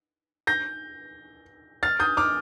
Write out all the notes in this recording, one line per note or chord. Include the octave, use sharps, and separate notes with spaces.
G6 A#6
F6 A6
D#6 G6
D6 F6